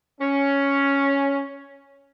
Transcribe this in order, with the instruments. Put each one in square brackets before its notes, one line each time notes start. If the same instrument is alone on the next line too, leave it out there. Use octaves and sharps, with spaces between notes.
[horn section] C#4